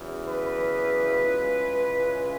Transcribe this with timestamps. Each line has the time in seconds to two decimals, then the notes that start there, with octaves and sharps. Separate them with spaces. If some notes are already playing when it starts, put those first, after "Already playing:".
Already playing: E2 C#3 F#3
0.27 B4
1.20 C#2 C#3 E3 G#3